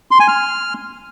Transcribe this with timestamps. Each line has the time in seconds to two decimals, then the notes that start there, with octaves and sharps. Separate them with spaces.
0.11 C6
0.20 G#5
0.28 F6